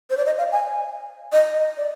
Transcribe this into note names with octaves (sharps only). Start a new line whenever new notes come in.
C5
D5
D#5
F5
G#5
D#5
D5